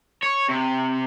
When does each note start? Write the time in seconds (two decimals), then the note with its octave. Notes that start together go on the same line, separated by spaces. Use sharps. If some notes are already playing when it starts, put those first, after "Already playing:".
0.23 C#5
0.49 C3